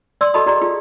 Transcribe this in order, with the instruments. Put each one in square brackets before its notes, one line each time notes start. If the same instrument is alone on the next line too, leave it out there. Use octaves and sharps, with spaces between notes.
[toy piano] D5 C6 E6
F#4 A4 D#5 A5 B5 D#6
F#4 G#4 D5 A#5
F4 G#4